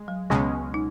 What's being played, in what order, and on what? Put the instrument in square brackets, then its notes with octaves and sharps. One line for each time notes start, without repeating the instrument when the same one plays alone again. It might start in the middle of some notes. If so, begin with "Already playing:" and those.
Already playing: [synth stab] G#3
[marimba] F#3
[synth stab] C#2 B2 G#3 C#4 [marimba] B3
[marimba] D#4